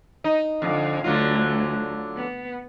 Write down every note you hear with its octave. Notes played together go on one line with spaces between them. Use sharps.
D#4
F2 D3 F5
D2 D3 F#3 F4
B3